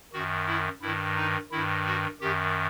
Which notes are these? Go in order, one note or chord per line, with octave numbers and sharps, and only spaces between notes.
F#2 D#3 F#4
E4
G2 D#3 E4
D#4
G2 D#3 E4
F#4
F#2 D#3 G4